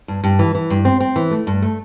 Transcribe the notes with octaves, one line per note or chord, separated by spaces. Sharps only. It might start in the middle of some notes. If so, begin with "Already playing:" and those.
G2
G2
E3
E3
G2
C4
C4
E3
A3
G2
A3